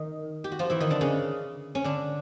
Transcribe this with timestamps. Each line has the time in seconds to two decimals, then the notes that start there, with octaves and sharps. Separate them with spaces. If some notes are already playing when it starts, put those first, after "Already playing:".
Already playing: D#3 D#4
0.44 G4
0.52 F#4
0.59 F3 F4
0.70 E3 E4
0.80 D#3 D#4
0.90 D3 D4
1.01 C#3 C#4
1.75 C#4
1.84 D3 D4